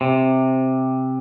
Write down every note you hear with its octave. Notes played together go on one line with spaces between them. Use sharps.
C3